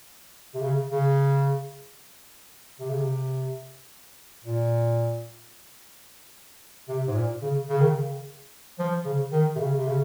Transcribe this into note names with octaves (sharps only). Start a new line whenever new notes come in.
C3
C#3
C#3
C3
C#3
C3
A#2
C3
G#2
A#2
C#3
C#3
D#3
C#3
F3
C#3
D#3
C3
C#3
C3
C#3